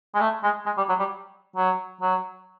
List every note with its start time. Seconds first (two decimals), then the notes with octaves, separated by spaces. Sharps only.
0.14 G#3
0.21 A3
0.43 G#3
0.66 G#3
0.77 G3
0.88 F#3
0.99 G3
1.56 F#3
2.01 F#3